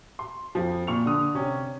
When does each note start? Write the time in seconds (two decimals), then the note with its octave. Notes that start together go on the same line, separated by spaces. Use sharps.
0.19 C6
0.55 F2 F3
0.87 A#2 C#6 F7
1.06 D3 D#6
1.34 C3 C#4